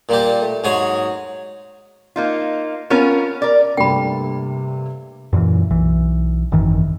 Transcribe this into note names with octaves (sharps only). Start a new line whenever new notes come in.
A#2 G3 A#3 G4
A3
G#2 F#3 G#4 C#5
A#3 D#4 F4
B3 C#4 F4 A#4
A#4 D5
G2 C3 A3 A#3 G5 B5
F#2 A#2 D3 E3
B1 E3
G#1 F#2 D#3 E3